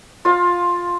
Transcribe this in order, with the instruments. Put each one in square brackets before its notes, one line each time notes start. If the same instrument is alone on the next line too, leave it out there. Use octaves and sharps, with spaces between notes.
[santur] F4 F5